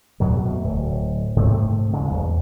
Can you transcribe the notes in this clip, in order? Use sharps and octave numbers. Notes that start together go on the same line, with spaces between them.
F2 B2 F#3
A3
D1
G#2 C3 A3 C4
D2 C#3 G#3
E2